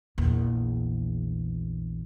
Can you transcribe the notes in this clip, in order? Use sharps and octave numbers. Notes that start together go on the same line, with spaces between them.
A#1 E2